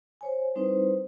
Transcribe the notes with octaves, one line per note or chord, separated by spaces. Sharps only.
C5 C#5 G#5
G3 C4 D#4 E4 B4 C5